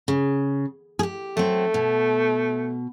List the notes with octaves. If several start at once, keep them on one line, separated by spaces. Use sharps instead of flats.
C#3
G4 G#4
F#3 A3 C4
B2